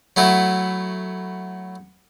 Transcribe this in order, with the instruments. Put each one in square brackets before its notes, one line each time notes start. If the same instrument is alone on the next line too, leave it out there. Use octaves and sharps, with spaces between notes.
[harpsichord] F#3 A3 E4 F#4